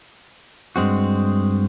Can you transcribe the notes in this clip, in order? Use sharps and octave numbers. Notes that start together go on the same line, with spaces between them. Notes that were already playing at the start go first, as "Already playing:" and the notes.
G2 G#3 C4 F#4